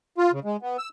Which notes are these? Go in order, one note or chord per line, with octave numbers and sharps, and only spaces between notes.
F4
C#3
G#3
B3
E6